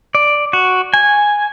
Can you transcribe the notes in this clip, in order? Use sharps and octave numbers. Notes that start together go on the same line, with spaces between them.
D5
F#4
G#5